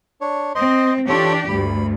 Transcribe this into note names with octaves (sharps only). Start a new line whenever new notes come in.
D4 C#5
C4 C5 D#5 C6
E3 D4 F4 G4 A4 C#5
D2 G2 B5